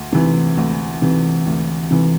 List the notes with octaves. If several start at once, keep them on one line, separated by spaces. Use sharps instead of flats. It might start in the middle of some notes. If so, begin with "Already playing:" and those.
Already playing: D2
C3 E3
D2
C3 E3
D2
C3 E3